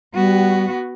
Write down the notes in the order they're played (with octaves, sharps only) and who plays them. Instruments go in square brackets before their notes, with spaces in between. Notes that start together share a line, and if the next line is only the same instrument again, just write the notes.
[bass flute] G3 [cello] B3 F#4